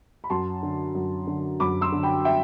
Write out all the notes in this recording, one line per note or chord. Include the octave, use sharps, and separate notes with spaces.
B5
F#2 A5 C6
D3
F#2
D3
F#2 B5 D6
C6 E6
D3
G5 B5
E5 G5